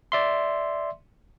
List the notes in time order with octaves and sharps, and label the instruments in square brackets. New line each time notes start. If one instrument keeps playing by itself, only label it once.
[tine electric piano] D5 E5 C6